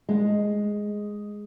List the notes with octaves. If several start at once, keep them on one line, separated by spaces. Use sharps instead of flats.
G#3